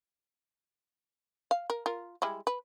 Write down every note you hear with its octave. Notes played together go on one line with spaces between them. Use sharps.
F5
A#4
F4 A#4
G3 G#3 E4
B4